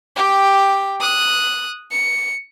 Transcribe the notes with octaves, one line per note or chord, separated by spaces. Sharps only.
G4 G5
D#6 F#6
C#7